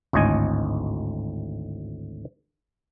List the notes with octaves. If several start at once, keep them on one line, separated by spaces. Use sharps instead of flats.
G#1 D2 A2 D#5 G#5